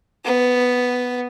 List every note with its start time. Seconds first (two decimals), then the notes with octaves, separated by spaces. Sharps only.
0.24 B3